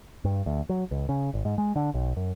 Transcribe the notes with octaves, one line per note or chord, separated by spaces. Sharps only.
G2
D2
F#3
C#2
C#3
G#1
G#2
G#3
D3
B1
F#2